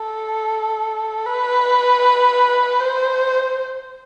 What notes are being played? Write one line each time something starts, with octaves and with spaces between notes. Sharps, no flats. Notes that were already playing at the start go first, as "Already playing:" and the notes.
Already playing: A4
B4
C5